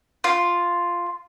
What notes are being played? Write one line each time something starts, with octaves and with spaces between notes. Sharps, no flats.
F4